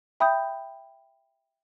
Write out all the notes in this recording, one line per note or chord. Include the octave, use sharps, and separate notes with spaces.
E5 G5 B5 D#6 G6